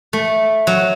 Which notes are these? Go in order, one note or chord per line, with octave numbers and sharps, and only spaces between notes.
A3
F#3